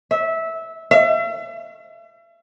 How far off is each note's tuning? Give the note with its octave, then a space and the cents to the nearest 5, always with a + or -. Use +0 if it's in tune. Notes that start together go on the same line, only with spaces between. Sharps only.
E5 -15
E5 +40